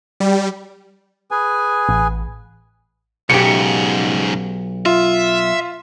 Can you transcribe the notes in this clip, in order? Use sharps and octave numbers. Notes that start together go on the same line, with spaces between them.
G3
G#4 B4 G#5
A1
B1 G#2 C#3 G4 C#7
F4 E5